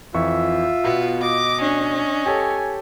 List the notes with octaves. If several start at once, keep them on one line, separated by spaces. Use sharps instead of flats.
F2 E3 F4 E5 C#6
B2 B3
D#5 D6
C#4 D4
G4 A4 C#5 G#5